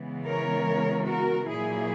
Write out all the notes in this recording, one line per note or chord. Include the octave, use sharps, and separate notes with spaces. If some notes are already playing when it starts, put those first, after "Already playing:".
Already playing: C#3 E3 G#3 B3
A#4 C#5
F#4 A#4
A#2 F#3 A#3 E4 G#4